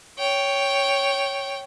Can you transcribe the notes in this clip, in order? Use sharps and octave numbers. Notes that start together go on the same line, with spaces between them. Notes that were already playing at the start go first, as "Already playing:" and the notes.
C#5 G5